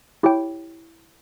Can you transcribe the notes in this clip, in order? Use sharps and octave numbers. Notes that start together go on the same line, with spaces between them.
E4 G4 C#5 G5